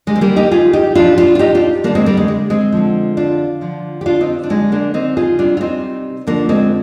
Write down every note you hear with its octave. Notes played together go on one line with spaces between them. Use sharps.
D3 G3 G#3
C4
G3 A#3
D#4 G4
F4 G#4
D#4 G4
A#2 F3 D4 F4
D4 F4
F4
D#4 G4
D4 F4
D3 G3 A#3 D4
G#3 C4
G3 A#3
G#3
G#3
G#3 C4
D3 F3
D4 F4
D3 F3
G4
D4 F4
C4 D#4
D4
D3 G3 G#3 C4
A#3 D4
C4 D#4
F4 G#4
C3 G3 D4 F4
F4
C4 D#4
D3 F3 A#3 D4
G#3 C4